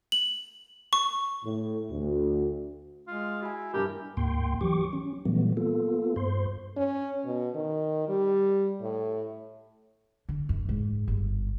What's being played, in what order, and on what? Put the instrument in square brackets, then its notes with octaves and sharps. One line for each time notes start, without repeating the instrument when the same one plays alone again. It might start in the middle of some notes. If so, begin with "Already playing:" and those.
[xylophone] F#7
C#6
[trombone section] A2
D2
[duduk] G#3 [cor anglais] F4
[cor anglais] E4 [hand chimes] F#4 G#5
[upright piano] G2 E3 G3 [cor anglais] G4 [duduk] A#4
[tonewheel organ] D2 G#2 A#3 G5 C6
E3 F#3 G4 C#6 D6
C#4
A#2 E3 F#3 G3 A3 B3
A#3 B3 F4 A4
G2 C5 C6
[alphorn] C#4
B2
D#3
G3
A2
[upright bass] D3
F#2
G#2
G1